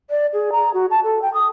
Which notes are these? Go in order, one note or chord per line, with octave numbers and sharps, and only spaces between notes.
D5
G#4
A#5
F#4
A5
A4
G5
D#6